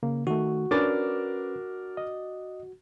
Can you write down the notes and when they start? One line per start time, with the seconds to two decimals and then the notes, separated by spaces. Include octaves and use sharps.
0.03 C#3 A#3
0.27 D#3 A3 F#4
0.71 C#4 D4 A#4 B4 D6 A6
1.97 D#5